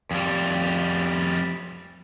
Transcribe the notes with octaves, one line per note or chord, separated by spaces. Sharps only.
F2 G3